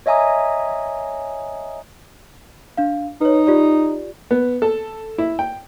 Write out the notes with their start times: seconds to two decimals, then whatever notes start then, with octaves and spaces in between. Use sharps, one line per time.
0.06 C#5 D#5 E5 G#5 A#5 D#6
2.77 D4 F5
3.21 D#4 B4 C#5
3.47 F4 G4 D5
4.31 B3
4.62 A4
5.18 E4
5.39 G5